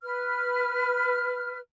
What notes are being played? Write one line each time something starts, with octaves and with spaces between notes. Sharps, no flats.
B4 F6